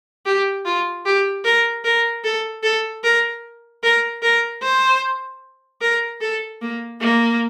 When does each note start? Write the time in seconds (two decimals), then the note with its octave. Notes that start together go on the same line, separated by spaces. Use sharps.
0.26 G4
0.65 F4
1.06 G4
1.45 A#4
1.85 A#4
2.24 A4
2.63 A4
3.04 A#4
3.83 A#4
4.23 A#4
4.62 C5
5.81 A#4
6.21 A4
6.61 A#3
7.01 A#3